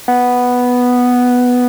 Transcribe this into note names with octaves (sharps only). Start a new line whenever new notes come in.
B3